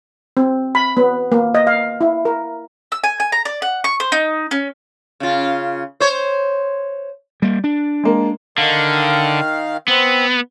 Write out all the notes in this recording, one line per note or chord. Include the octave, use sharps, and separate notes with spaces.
C4
B5
B3
A#3
D#5
F5
E4
A#4
E6
G#5
G#5
A#5
D5
F#5
C#6
C5
D#4
C#4
C#3 F4
C5 C#5
G3 A#3
D4
G#3 A#3
D3 D#3 F5
B3 C4